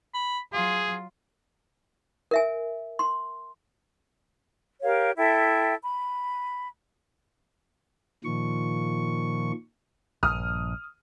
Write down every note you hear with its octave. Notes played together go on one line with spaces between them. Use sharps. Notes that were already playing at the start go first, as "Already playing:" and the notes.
B5
F#3 F4 G#4
A#4 E5 G#5
C6
G4 A#4 C#5 F5
E4 A4 E5 G5
B5
A#2 D#3 F3 C#6
A#1 G2 D#6 F6